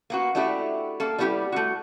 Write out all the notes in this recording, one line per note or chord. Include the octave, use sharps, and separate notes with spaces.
A#3 B3 F#4
A3 D4 E4 F#4 G4
A#3 A4
G3 B3 E4 F4 G4
A3 F#4